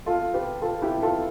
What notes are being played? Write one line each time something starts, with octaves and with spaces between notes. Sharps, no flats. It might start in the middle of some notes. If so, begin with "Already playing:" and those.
F4 A4
G4 B4
F4 A4
E4 G4
F4 A4